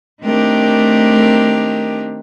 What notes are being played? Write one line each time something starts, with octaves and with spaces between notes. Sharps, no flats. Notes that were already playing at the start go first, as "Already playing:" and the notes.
D#3 A3 C4 D4 G4 A#4